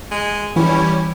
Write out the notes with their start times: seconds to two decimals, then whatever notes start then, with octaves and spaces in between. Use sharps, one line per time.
0.11 G#3
0.56 E3 G3 C#4 E4